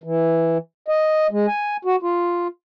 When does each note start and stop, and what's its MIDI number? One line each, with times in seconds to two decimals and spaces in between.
0.04 0.58 52
0.88 1.27 75
1.31 1.46 56
1.47 1.77 80
1.85 1.96 66
2.02 2.47 65